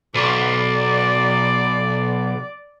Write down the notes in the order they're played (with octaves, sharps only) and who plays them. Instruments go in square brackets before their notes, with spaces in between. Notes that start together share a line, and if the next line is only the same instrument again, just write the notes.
[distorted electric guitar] B1 [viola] D5